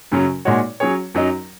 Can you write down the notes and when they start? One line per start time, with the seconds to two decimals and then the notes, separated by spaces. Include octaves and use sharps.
0.12 F#2 C#3 F#3 C#4
0.45 A#2 G#3 D#4 F#4 C#5
0.80 F#3 C#4 G#4 C#5
1.14 F#2 F#3 D#4